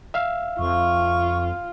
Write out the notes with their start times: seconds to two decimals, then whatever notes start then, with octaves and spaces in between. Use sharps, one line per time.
0.14 E5 F5
0.59 F2 F4 C#6